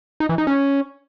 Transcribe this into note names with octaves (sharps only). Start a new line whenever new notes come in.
D#4
E3
D#4
C#4